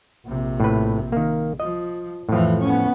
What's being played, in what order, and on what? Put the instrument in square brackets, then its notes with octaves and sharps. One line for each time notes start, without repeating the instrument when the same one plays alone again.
[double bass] A#1 C3
[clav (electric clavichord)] A2 B4
D#3 A#3
[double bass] F3 [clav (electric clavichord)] D#5
[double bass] F2 E3 [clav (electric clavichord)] A2 F3
[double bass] B3 C#4